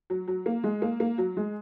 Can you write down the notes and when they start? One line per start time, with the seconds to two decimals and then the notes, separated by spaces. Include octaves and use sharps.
0.10 F#3
0.28 F#3
0.46 A#3
0.64 G#3
0.82 A#3
1.00 A#3
1.18 F#3
1.37 G#3